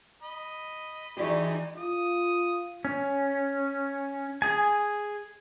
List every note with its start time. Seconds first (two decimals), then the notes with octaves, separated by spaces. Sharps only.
0.22 D#5 B5
1.17 E3 G#3 D#4 F#4 G4 D5 C#6
1.77 F4 D#6
2.85 C#4
4.42 G#4 G#5